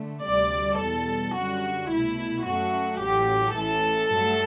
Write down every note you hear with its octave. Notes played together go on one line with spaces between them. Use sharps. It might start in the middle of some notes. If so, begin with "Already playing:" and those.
Already playing: D3 A3
D2 C3 G3 D5
E2 B2 G3 A4
F#2 D3 G3 F#4
C2 B2 A3 E4
F#2 F#3 A3 F#4
A1 A2 F#3 G4
A1 A2 E3 A4
G2 F#3 A3